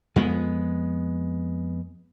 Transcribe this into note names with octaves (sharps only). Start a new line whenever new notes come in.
F2 G#3 B3